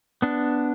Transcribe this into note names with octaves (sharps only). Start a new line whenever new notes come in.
B3 D4